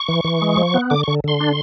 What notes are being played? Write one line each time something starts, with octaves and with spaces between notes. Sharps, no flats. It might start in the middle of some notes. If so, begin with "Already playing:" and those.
Already playing: C#6
E3
E3
G#3
F3
B3
D3 D6
D3 C#6
D3 C6
D4